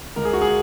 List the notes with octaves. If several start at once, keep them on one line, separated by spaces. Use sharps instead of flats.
C#2 A#4
G#4
F#4
G#4